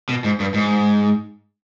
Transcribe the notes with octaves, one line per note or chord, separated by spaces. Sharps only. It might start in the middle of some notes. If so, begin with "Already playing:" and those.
B2
G#2
G2
G#2